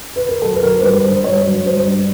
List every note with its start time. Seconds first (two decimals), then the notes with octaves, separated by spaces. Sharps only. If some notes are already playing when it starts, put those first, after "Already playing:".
0.16 B4
0.29 A#4
0.42 F#3 A4
0.54 B4
0.63 F#3 A#4
0.79 C5
0.83 G2 B4
1.03 F#3 C5
1.24 G2 C#5
1.45 F#3
1.65 G2 C5
1.87 G2